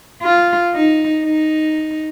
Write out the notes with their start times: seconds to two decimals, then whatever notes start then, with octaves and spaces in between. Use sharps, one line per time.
0.23 F4
0.74 D#4
1.25 D#4